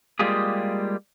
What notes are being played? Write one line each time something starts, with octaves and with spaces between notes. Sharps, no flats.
G3 G#3 A#3 F4 G4 G#4